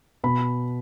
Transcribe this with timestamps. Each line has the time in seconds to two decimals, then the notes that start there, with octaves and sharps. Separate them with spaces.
0.24 B2 B5